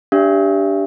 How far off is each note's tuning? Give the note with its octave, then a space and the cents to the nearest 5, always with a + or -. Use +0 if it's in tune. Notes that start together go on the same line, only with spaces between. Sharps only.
D4 -10 G4 +0 E5 +35